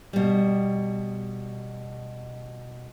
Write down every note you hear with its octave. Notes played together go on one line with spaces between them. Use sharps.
B2 G3